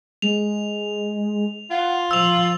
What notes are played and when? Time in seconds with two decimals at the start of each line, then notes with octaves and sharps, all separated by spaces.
0.22 G#3 F7
1.70 F4 F#5
2.11 F3 C6 E6 F7